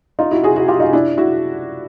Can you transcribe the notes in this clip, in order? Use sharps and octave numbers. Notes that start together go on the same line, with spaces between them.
D#4 F4
E4 F#4
F#4 G#4
E4 F#4
F4 G4
D#4 F4
D4 E4
E4 F#4